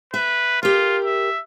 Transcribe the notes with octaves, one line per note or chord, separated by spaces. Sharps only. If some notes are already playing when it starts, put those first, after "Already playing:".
B4 E5
F4 G4 A#4
E5